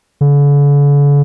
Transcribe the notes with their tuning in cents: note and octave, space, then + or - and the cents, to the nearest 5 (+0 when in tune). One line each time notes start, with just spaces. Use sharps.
D3 -45